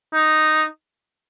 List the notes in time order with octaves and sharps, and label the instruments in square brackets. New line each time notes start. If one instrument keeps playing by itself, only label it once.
[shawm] D#4